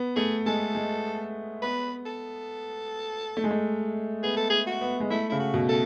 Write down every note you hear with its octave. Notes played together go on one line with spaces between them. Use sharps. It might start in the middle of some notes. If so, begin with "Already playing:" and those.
Already playing: B3
A3 G#4
G#3 A4
G#3
B3 B4
A4
A3
G#3
A3
B3 G#4
A4
G#4
F#4
B3
G#3
A3 E4
C#3 E4
F#4
B2
A4